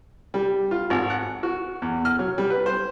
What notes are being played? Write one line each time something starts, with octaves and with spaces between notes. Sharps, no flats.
G3
F4
G#1
F#5
F#4
E2
F6
F#3
G3
B4
C5